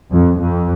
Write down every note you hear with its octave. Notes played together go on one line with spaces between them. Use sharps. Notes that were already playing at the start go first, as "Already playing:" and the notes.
F2
F2